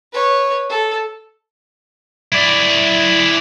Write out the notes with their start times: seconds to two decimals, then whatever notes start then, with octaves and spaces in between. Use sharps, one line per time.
0.12 B4 C#5
0.69 A4
2.32 E4 D5